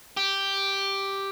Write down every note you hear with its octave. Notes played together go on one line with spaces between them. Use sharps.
G4